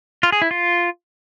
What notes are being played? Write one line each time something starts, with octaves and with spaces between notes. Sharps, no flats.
F4
G#4
E4
F4